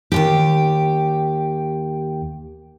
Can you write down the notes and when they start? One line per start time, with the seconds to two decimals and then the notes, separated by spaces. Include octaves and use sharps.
0.12 D#2 G#2 G4